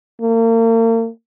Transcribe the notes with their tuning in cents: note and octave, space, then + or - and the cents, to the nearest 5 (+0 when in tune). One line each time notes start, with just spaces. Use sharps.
A#3 -40